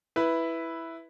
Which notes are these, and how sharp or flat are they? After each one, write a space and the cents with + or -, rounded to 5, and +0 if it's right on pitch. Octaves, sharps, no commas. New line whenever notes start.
E4 +0 B4 +0